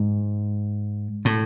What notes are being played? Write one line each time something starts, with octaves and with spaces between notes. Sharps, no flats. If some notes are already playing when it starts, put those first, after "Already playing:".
Already playing: G#2
A2